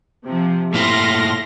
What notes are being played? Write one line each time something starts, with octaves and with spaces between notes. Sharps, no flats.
C3 F3
A#2 A3 E4 C6 F6 A#6